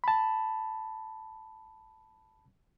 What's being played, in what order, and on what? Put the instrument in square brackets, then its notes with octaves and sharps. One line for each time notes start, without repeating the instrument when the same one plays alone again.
[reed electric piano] A5 B5